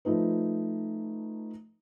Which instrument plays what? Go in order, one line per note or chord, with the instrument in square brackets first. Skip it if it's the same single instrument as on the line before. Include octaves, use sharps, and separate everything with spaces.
[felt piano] F3 A3 D#4 B4